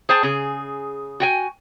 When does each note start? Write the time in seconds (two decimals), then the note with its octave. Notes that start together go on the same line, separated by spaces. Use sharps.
0.09 G#4 C5 G5 A5
0.23 C#3 G#4
1.20 F#4 G5 G#5